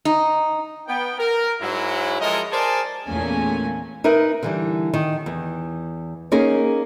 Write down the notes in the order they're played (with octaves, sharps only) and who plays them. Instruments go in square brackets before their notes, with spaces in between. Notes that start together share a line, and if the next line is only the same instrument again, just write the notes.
[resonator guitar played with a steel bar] D#4
[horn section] B3 G5
A#4
G#2 F#3 E4
F3 G#3 E4 A4 A#4 D#5
G#4 A#4 C5 D5 G#5 A5
[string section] E2 A#2 A3 A#3 C#4 G#5
[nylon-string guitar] D#4 A#4 B4 E5
D3 E3 G3
D#3
E2
A#3 C#4 D#4 G#4 A#4